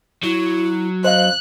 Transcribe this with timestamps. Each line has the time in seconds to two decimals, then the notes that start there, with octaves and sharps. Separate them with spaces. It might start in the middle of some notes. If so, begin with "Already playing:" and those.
0.24 F#3 E4
1.04 C5 D#5 F5 F#6